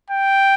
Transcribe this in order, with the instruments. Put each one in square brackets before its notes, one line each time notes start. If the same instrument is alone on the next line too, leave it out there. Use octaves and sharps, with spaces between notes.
[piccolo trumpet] G5